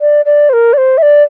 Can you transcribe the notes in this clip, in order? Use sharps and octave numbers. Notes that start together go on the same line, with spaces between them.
D5
D5
C5
A#4
D5
C5
E5
D5